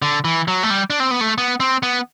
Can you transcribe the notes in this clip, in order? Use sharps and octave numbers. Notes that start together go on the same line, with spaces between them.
D3
E3
F#3
A3
G3
D4
C4
B3
A3
B3
C4
B3